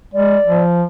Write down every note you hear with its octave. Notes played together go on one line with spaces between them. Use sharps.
G#3 D5
F3